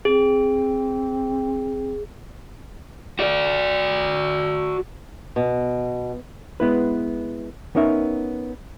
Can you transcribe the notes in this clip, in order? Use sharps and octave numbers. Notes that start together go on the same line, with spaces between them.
C4 G#4
F#4 D5
B2
G#3 B3 E4 B4
B3 C#4 D#4 A#4 E5